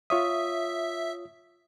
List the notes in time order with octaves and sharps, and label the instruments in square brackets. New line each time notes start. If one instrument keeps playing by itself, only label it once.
[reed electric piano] F4 C#5 D#6 [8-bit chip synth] E5